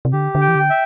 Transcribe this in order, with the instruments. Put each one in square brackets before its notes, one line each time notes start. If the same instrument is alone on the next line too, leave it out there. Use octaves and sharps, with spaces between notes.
[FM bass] C3
[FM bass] D3 [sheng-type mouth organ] G4
[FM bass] D3
[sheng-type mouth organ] G5
[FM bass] E3
D3
[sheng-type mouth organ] E5